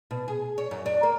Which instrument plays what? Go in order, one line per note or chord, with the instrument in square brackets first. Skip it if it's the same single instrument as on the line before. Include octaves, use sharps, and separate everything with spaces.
[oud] B2
G#4
C#5
F#2
D4
A#3